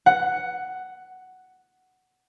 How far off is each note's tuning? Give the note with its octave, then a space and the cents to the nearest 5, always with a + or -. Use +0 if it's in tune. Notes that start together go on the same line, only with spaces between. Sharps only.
F#5 +5